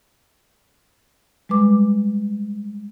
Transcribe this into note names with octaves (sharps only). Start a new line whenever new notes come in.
G3 G#3 B4 D6